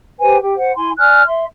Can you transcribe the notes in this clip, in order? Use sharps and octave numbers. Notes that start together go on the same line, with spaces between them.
G4 B4 C5 G#5
G4
C5 F#5
E4 G#5 C6
D5 G#5 F6 F#6
E5 C6